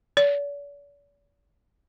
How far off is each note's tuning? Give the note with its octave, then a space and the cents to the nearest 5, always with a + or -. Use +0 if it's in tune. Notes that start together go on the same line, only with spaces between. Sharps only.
D5 -45